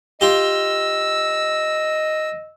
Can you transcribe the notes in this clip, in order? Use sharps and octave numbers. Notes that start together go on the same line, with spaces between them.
F4 G4 D#5 E6